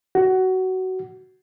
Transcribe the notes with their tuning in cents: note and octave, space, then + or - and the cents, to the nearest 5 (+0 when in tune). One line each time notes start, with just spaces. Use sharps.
F#4 +20